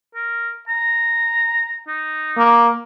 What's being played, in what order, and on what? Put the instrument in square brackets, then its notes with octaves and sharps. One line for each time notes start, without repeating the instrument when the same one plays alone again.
[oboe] A#4
A#5
D#4
[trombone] A#3